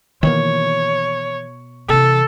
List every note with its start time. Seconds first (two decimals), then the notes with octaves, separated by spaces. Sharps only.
0.23 B2 D#3 E3 A#3 C#5
1.89 C3 E3 A4